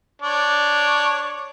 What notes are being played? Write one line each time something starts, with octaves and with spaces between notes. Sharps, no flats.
D4 C#5 D6